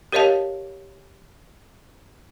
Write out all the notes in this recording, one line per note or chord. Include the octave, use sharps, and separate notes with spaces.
G4 A#4 C#5 D#5 F5 A5